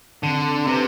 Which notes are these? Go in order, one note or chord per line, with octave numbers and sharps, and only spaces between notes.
D3 C4
C3 G4 B4